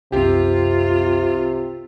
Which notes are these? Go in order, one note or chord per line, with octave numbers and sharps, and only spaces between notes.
C2 F#2 C3 C4 F4 G4